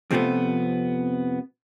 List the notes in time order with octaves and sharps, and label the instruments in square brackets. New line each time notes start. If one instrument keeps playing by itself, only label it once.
[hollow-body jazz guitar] F2 C3 F3 A3 B3